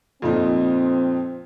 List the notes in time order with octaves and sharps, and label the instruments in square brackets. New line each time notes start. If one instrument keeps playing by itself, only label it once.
[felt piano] F2 A#2 D#4 [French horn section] C4